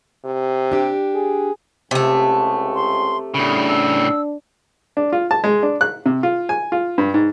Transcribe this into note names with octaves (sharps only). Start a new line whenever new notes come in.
C3
D4 G4
G#4
C#2 C3 A3
C6
A2 C#3 D4 B5
E6
D4
F4
A5
G#3
D4
F#6
C3
F4
G#5
F4
G2
G#2